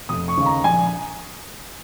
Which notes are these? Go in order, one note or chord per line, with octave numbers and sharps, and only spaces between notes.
F1 D#6
C#6
D#2 C#3 G#3
A#5
A#1 G#5